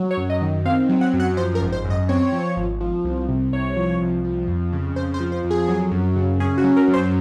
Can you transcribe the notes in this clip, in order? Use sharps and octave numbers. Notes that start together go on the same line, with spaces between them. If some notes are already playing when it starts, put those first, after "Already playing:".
Already playing: F#3
C#5
F#2
D#5
D#3
C4 F5
F#3
F#5
F#2
F#5
F3 C5
A#4
G#1
C5
F#2
D#5
C4 C#5
F3
G#1
F3
C2
C3
C2 C#5
F3
C2
F3
F2
C#3
F2 C5
C5
F3
C5
F2
G#4
F#3
F#2
C#3
C#4 G#4
F#4
F#3
A#4
F#2
C5